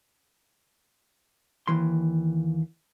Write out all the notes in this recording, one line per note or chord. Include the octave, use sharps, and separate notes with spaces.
D#2 E3 C6